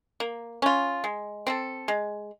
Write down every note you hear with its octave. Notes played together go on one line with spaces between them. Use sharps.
A#3
C#4 F4
G#3
C4 E4 A4
G#3